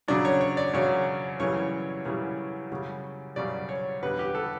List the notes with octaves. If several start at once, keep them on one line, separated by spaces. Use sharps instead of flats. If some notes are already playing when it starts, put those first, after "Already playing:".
F#2 C#3 F#3 D4
C#5
C#5
D5
F#2 C#3 F#3 C#5
F#2 C#3 E3 G3 C#5
F#2 C#3 E3 G3
F#2 C#3 G3
F#2 C#3 G3 D5
C#5
E2 D3 G3 B4
G4
A4